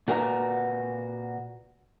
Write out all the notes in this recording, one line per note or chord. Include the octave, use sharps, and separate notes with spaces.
A#2 F#4 A#4 B4 G#5 A#5